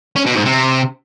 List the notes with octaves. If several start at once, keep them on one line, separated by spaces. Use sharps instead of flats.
C#4
B2
G#2
C3